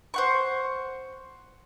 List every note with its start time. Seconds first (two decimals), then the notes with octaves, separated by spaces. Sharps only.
0.14 C5 F#5 C#6